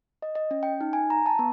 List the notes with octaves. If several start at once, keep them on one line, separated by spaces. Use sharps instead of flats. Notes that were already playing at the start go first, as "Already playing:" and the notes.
D#5
D#5
C#4
G5
D#4
G#5
A#5
A5
B3